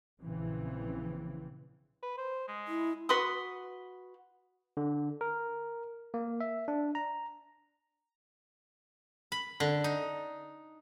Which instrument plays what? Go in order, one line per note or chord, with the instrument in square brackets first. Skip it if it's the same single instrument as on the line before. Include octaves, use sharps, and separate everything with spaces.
[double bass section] A#1 C#3 E3 C4
[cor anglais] B4
C5
G#3
[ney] E4
[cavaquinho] F#4 B4 C6 D#6
[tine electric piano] D3
A#4
A#3
E5
D4
A#5
[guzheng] B5
D3
D#4